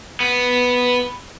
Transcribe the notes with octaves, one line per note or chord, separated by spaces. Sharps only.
B3